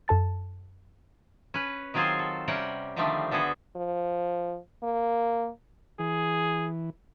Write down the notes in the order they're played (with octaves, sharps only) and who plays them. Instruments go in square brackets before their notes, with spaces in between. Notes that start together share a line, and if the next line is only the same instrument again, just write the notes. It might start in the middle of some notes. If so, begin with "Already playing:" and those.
[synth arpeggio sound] F#2 A4 A5 A6
[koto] C#4 B4
D#3 F#3 C4 F4 G#4 C5
A4
C3 G3 C#4 A#4 F#5 G5
D3 D#3 F3 G3 A3 C4
D3 B3 F#4 G#4 A4
[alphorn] F3
A#3
[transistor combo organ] E3 [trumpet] G#4